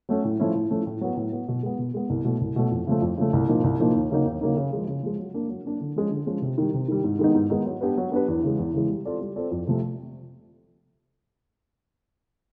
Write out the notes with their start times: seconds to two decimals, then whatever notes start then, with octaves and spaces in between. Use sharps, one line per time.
0.09 F#3 A3 C#4
0.24 A2
0.40 F3 A3 C#4 E4
0.55 A2
0.71 F3 A3 C#4 E4
0.87 A2
1.01 F#3 B3
1.17 A2
1.32 F#3 B3
1.48 B2
1.63 G#3 B3
1.79 B2
1.94 G#3 B3
2.10 C2
2.25 B2 F#3 A3
2.41 C2
2.56 B2 F#3 A3
2.71 F2
2.87 C#3 F3 A3
3.02 F2
3.17 C#3 F3 A3
3.33 C2
3.49 A#2 F3 A#3 D#4
3.64 C2
3.80 A#2 F3 A#3 D#4
3.95 D#2
4.11 C#3 F#3 A#3 D#4
4.25 D#2
4.41 C#3 F#3 A#3 D#4
4.56 C#3
4.73 F3 G#3
4.88 C#3
5.03 F3 G#3
5.19 F#3
5.34 A#3 D4
5.49 F#3
5.66 A#3 D4
5.80 D3
5.96 F3 G#3 C#4
6.11 D3
6.26 F3 G#3 C#4
6.42 C3
6.58 D#3 G3
6.74 C3
6.88 D#3 G3
7.04 G#2
7.19 D#3 G#3 B3 D#4
7.35 G#2
7.50 D#3 G#3 B3 D#4
7.66 F#3
7.81 B3 D4 G4 B4
7.98 F#3
8.12 B3 D4 G4 B4
8.28 E2
8.43 C#3 E3 G#3
8.59 E2
8.74 C#3 E3 G#3
8.89 G3
9.05 C4 F4 A4 D5
9.21 G3
9.36 C4 F4 A4 D5
9.51 F2
9.67 C3 F3 A3